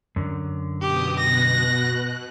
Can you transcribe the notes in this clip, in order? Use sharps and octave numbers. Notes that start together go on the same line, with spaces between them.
F#2 D3
B2 G4 D#6
B2 F#6 A#6